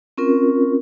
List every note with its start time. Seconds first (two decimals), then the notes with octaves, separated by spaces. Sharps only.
0.18 C4 C#4 F4 A#4